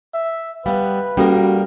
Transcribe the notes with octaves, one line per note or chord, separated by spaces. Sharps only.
E5
G3 B3 B4 F5
G3 A#3 C#4 F#4 A4 A#4 B5